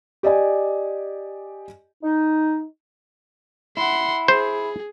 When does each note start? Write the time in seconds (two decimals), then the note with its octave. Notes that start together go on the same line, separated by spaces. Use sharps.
0.23 G4 D5 D#5 G#5
2.03 D#4
3.77 E4 F#5 C6
4.28 G#4 C5